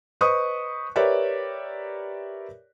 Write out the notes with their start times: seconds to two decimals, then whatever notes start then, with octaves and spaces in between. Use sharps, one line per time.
0.21 B4 C5 D#5 C#6 D#6
0.96 G4 A#4 B4 C#5 D5 E5